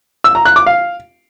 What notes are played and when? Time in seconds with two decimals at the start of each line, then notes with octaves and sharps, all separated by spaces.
0.24 E6
0.35 A#5
0.45 F#6
0.56 D6
0.66 F5